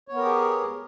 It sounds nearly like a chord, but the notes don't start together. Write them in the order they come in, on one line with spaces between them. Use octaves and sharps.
C#5 B3 A#4 G4 G#4